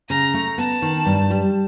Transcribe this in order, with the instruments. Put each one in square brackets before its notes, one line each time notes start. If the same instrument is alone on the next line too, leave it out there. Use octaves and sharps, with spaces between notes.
[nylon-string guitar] C#3 [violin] A#5
[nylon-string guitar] A3
[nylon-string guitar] B3 [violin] A5
[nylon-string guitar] D#3
G2
G3